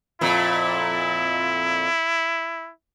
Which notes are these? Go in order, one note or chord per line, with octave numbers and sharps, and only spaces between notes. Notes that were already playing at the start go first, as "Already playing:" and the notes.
F2 A#2 E4